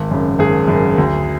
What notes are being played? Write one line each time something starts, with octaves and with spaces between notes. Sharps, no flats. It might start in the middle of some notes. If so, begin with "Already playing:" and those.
Already playing: G#1
F#2 C#3
G#1 G#4
F#2 C#3
D2